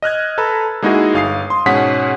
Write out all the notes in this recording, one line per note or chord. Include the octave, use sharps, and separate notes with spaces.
D#5 F6 F#6 G#6
A4 B4 A#5 B5 E6
G#3 A#3 D#4 E4 F#4 G#4
G1 F5 D#6 C7
C6
G#2 B2 C#4 G#4 F#5 B6